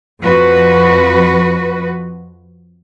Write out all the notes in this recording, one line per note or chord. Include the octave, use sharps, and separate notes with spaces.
F2 F3 F#4 B4